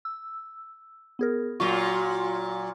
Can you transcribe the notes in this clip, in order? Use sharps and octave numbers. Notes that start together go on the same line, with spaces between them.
E6
B3 G#4 A#4
A#2 F#3 F4 C#6